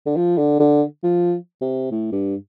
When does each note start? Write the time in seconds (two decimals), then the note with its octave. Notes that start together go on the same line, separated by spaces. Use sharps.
0.06 D3
0.16 F3
0.38 D3
0.60 D3
1.04 F3
1.61 C3
1.91 A2
2.12 G2